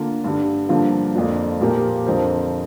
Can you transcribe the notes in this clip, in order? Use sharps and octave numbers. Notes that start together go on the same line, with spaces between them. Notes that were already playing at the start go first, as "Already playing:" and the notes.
Already playing: D3 A#3 F4
G2 D3 G3
G2 D3 F3 A#3 F4
F2 F3 A#3 D4 F4
A#2 F3 A#3 G4 A#4
F2 D3 F3 C4 A#4